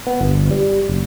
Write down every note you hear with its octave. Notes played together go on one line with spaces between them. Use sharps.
B3
G1
G3
F#1